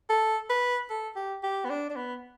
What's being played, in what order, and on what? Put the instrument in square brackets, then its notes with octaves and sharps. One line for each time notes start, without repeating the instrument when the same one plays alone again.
[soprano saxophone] A4
B4
A4
G4
G4
B3
D4
D4
B3